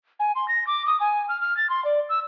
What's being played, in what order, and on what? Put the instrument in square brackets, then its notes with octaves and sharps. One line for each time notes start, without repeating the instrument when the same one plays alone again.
[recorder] G#5
C6
A#6
D6
D#6
G#5
F6
F6
A6
C6
D5
E6